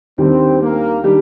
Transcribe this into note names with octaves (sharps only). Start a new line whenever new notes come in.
D#2 D#3 G3 C4 D4 G4
A#3
D#3 G3 D4 G4